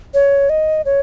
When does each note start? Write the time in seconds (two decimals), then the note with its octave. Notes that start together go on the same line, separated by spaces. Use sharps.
0.14 C#5
0.49 D#5
0.85 C#5